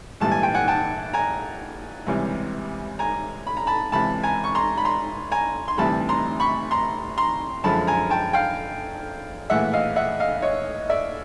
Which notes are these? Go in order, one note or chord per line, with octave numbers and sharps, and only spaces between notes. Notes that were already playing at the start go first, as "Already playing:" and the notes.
A#1 G#2 E3 G3 A5
G#5
G5
F#5 G#5
G5 A5
G#5 A#5
C#2 C3 E3 G3
G#5 A#5
B5
A#5
A5 B5
C#2 C3 E3 A5 B5
G#5 A#5
C#6
A#5 C6
B5
A#5 C6
G#5 A#5
C6
D2 C3 E3 G3 A5 B5
A#5 C6
B5 C#6
A#5 C6
A#5 C6
F#2 D3 F3 G#3 A5 B5
G#5 A#5
G5 A5
F5 G5
A#1 A2 E3 G#3 E5 F#5
D#5 F5
E5 F#5
D#5 F5
C#5 D#5
D5 E5